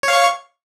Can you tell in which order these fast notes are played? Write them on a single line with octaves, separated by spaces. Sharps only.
C#5 F5 C#6